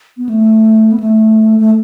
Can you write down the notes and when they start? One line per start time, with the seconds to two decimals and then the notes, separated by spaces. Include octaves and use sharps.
0.17 B3
0.29 A3
0.92 B3
1.00 A3
1.60 A3